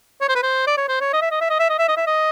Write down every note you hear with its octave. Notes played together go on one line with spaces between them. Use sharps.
C#5
C5
B4
C5
D5
C#5
C5
C#5
D#5
E5
D#5
E5
D#5
E5
D#5
E5
D#5
E5
D#5